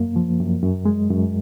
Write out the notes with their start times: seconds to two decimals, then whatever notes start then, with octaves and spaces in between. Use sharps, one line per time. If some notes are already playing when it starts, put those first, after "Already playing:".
Already playing: F#2 A#3
0.16 F3
0.40 F#2
0.63 F#2
0.85 G#3
1.10 F#2